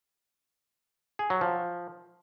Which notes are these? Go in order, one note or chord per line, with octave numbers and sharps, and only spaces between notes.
G#4
F#3
F3